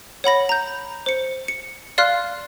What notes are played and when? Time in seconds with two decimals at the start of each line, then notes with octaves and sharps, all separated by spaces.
0.24 C#5 F#5 B5 A#6
0.49 A#5 G6
1.06 C5 C#7
1.48 C#7
1.98 D5 F5 C6 F6 F#6